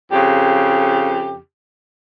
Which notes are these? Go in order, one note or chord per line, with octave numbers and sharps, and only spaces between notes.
F2 C#3 G4